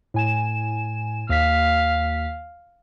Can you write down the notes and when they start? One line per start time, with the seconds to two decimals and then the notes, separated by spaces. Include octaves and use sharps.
0.14 A2 G#5 E7
1.29 D#2 F5 B6